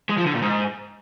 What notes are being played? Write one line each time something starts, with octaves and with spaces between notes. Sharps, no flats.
G#3
F3
D3
A#2
G#2